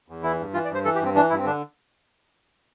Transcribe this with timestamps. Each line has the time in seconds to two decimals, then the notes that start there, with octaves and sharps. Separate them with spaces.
0.09 E2
0.23 E3 E4
0.39 G2
0.54 E3 F4
0.65 D5
0.70 G2 C5
0.85 E3 A4
0.95 G4
1.01 G2 C4
1.15 E3 D4
1.30 G2 E4
1.38 C4
1.46 D3 D4